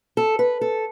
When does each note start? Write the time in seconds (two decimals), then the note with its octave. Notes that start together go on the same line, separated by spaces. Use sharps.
0.17 A4
0.39 B4
0.61 A4